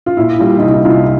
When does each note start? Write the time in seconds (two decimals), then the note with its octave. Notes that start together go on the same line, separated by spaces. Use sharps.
0.06 F4
0.17 A#2 E4
0.39 G3 F4
0.59 D#4
0.62 C2 E4
0.85 C2 F4